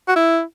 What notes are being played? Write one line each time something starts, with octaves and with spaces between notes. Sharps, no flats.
F#4
E4